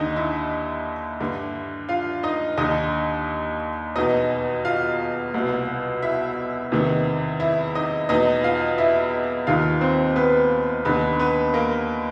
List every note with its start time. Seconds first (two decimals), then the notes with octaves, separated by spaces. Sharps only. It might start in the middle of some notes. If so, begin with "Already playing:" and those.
Already playing: D#2 D3 D#4 D#5
0.16 E4 E5
1.20 G2 D3
1.89 F4 F5
2.23 D#4 D#5
2.57 D#2 D3 D#4 D#5
3.96 E2 B2 D#4 D#5
4.65 F4 F5
5.34 C2 B2
6.03 E4 E5
6.72 E2 C3 D#3
7.40 E4 E5
7.75 D#4 D#5
8.09 E2 B2 D#4 D#5
8.44 F4 F5
8.78 E4 E5
9.47 D#2 D#3 F4 F5
9.81 C4 C5
10.16 B3 B4
10.85 D#2 D3 B3 B4
11.19 B3 B4
11.54 A#3 A#4